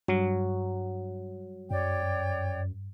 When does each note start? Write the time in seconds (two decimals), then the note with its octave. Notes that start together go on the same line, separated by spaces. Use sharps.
0.08 G2 F#3
1.71 F#2 C#5 D5 G5